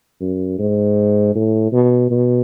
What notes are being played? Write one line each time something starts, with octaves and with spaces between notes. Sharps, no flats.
F#2
G#2
A2
B2
B2